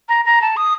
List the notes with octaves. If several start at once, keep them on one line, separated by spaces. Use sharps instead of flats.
A#5
A#5
A5
D#6